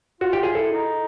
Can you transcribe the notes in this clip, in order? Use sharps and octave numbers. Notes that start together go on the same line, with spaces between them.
F4 F#4
G4
F4
G#4
E4 A4
D#4